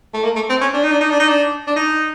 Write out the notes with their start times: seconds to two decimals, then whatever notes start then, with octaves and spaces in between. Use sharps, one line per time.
0.14 A3
0.24 A#3
0.36 A3
0.50 C4
0.61 C#4
0.74 D4
0.83 D#4
0.92 D4
1.01 D#4
1.10 D4
1.20 D#4
1.29 D4
1.67 D4
1.76 D#4